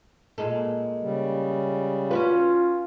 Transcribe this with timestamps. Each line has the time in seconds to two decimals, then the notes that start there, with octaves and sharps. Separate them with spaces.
0.38 A#2 G#3 A4
1.00 C#3 G3
2.11 C#4 F4 F#4 B4